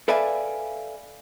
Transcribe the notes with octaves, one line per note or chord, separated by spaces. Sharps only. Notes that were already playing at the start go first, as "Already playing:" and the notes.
A4 B4 D5 E5 F5 G#5